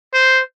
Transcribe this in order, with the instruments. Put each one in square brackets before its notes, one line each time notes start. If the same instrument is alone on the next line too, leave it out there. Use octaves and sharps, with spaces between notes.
[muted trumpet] C5